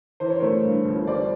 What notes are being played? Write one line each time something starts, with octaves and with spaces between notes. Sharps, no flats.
E3 C5
C#5
A3 A#4 C5
G2
G1
G3 C5 D5